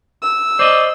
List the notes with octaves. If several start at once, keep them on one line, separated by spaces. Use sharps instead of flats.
E6
C5 D5 D#5